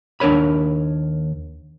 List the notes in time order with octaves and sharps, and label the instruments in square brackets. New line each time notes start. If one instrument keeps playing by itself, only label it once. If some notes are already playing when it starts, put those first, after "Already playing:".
[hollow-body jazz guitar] D#2 D4 A#4 C#5 B5